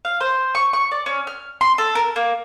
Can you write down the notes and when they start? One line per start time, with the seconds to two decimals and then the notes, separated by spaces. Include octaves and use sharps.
0.05 F5
0.20 C5
0.55 C#6
0.73 C#6
0.91 D5
1.06 C#4
1.27 F6
1.61 C6
1.78 A4
1.95 A#4
2.16 A#3